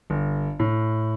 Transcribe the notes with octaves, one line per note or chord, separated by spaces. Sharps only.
G1
A2